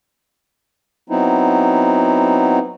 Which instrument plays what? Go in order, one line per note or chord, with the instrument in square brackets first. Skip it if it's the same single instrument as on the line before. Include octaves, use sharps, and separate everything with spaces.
[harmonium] F#3 B3 C4 D#4 E4